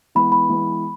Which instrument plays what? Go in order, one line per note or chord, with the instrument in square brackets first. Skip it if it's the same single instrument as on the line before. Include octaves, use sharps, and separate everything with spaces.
[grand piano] E3 G#3 B3 [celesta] B5
[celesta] B5
[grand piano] E3 G#3 B3